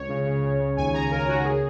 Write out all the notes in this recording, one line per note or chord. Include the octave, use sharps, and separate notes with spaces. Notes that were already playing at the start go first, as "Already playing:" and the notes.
Already playing: C#2 C#5
C#3
C#3
C#3
C#3
D#2 G#5
C#3 A#5
D#2 A#4
D#2 F#4
C#3 G#4